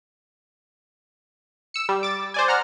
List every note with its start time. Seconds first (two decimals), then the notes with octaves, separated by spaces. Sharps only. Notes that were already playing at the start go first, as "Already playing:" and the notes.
1.74 E6 C#7
1.89 G3
2.03 D6 A6
2.34 C5 D5 G#5
2.48 F#5 A#5 F6